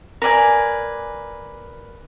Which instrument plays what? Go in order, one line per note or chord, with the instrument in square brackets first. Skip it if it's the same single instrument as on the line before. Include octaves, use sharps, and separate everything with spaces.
[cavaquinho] A#4 B4 D5 G#5